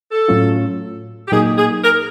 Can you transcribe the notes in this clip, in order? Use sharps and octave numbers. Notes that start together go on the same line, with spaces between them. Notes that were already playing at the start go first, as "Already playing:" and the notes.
A4
A2 F#3 A3 C#4 F4
G4
A#2 F#3 A#3 D#4 G#4
G#4
A#4